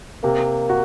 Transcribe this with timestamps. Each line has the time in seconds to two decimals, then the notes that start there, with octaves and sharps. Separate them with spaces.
0.23 C3 A#3
0.70 F#4